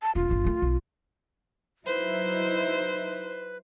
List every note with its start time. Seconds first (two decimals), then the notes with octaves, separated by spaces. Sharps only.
0.02 A5
0.15 E1 F4
0.29 G1 G2
0.44 D#3 A3
0.62 B1
1.86 F#3 D#4 E4 B4 C5